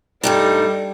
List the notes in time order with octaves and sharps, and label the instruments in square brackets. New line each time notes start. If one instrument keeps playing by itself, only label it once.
[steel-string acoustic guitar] G2 A3 D#4 [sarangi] G3 [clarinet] A4